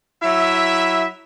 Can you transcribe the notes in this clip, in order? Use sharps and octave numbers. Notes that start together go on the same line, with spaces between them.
F#3 E4 E5